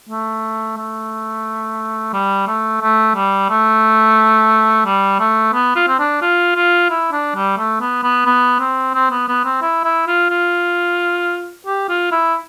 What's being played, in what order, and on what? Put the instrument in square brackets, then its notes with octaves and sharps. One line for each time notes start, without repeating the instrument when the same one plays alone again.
[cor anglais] A3
A3
G3
A3
A3
G3
A3
G3
A3
B3
F4
C4
D4
F4
F4
E4
D4
G3
A3
B3
B3
B3
C4
C4
B3
B3
C4
E4
E4
F4
F4
G4
F4
E4